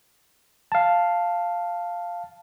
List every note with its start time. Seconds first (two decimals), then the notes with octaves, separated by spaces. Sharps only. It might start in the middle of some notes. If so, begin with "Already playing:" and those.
0.72 F5 A5